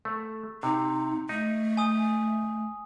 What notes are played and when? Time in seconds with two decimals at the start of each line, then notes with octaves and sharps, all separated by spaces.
0.05 A3
0.63 C3 D#4
1.29 A3 D#4
1.77 G#5 D#6